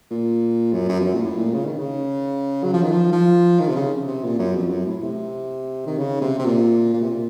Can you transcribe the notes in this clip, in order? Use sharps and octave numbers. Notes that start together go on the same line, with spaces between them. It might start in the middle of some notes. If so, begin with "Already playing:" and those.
A#2
F#2
F#2
F2
F#2
A#2
A2
A#2
C#3
D#3
C#3
F#3
F3
D#3
F3
F3
D#3
C3
C#3
C3
A#2
F#2
F2
F#2
A2
C3
D#3
C#3
C3
C3
A#2
A#2
C3
A#2